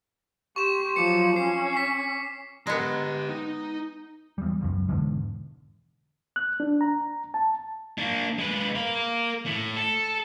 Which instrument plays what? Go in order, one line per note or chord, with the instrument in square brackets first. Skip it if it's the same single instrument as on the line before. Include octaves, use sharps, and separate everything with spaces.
[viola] G4 C6 [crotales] C#6 E7
[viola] F3 F#3 [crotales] D6 C#7
[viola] C#4 [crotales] C7
[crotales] B6 C7
[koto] G#3 B3 [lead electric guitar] G4 A#5
[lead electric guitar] D#4
[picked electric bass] E2 G3
F#1 C#2 F#2
E1 E2 G#2 D3
[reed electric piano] F#6
D4
A#5
A5
[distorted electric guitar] A#3 D4
G#3 B4
A#4 F5
A2
A4